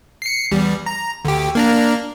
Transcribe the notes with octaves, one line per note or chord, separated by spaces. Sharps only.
C7 C#7
E2 G3
A#5
D2 G4
A#3 D4 A#5